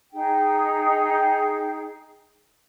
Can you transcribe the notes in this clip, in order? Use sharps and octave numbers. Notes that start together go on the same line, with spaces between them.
D#4 G#4 G5